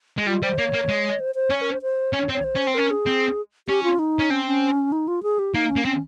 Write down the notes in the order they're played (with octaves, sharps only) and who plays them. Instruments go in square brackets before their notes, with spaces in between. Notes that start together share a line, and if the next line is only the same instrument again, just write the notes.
[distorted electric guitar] G#3
[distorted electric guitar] G3 [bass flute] F4
[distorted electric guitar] G3 [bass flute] C5
[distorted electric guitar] A#3 [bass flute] C#5
[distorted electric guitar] A#3
G#3
[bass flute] C5
C5
[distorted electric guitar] C#4 [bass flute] C#5
[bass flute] A#4
C5
C5
[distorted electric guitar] C#4 [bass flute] C#5
[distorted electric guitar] C4
[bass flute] C#5
C5
[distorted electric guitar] C#4
C4
[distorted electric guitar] C#4 [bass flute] A#4
[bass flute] G#4
[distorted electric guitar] C4
[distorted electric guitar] C#4 [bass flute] G4
[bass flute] F4
D#4
[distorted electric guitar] C#4
[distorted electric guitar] C4 [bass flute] C#4
[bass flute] C#4
D#4
F4
G#4
G4
[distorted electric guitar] A#3 [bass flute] D#4
[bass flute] C#4
[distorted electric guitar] A#3
[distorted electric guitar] C4 [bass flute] C#4